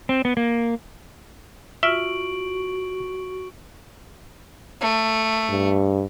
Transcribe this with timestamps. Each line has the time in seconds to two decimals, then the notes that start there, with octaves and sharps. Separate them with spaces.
0.09 C4
0.25 B3
0.37 A#3
1.83 F4 F#4 E5 C#6 F6 D7 F#7
4.81 A3
5.49 G2